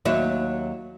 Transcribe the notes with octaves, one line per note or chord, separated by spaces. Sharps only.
D#2 F#3 E5